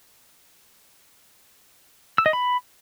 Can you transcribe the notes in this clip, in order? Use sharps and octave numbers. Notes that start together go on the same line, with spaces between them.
E6
D#5
B5